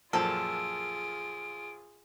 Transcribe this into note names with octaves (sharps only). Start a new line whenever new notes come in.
F#2 A#2 F3 F4 G#4 A4 D7